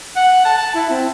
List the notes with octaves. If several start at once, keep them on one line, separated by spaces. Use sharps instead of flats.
F#5
A5
A5
E4
C4